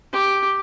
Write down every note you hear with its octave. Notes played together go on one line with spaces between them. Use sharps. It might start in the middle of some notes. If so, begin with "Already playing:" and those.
G4